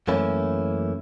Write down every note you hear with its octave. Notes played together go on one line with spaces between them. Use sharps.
F#2 E3 A3 A#3 C#4 E4